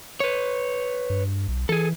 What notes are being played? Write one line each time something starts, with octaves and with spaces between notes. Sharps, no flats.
B4 C#5
G2
B1
E3 G#4 A4